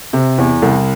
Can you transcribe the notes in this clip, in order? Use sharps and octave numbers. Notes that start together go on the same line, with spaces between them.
C3
E2
C2